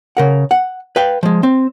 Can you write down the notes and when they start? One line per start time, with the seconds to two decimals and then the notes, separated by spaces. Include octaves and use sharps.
0.17 C#3 A#4 F#5
0.51 F#5
0.96 B4 F5 G5
1.23 F3 G#3
1.43 C4